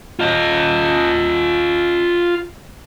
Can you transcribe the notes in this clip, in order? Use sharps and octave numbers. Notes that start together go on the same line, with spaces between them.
F4 D#5